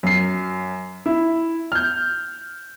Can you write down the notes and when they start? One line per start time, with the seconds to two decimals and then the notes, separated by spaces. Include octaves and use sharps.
0.03 F#2 C7
1.06 E4
1.72 F6 G6